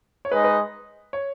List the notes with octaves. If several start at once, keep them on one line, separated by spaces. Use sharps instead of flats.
C#5
G#3 D#4 G#4 B4 D#5
B4
C#5